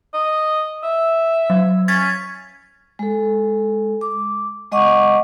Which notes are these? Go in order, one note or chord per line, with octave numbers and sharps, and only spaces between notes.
D#5
E5
F#3
C#4 G#6 A6 B6
G#3 A4
D6
G#3 D#5 F#5 C#6 D6